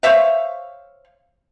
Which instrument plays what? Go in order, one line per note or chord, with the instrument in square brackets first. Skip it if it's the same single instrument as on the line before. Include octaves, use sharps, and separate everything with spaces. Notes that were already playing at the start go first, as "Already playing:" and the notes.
[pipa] C5 C#5 E5 F5